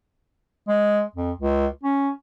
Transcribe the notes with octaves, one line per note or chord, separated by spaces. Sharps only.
G#3
F2
C#2
C#4